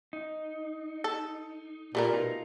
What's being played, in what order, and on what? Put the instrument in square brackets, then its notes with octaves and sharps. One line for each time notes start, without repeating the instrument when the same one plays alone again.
[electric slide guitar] D#4
[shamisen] A4
[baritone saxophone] A#2 [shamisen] G3 A3 A#4
[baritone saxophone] B2 [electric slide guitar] D#4 F4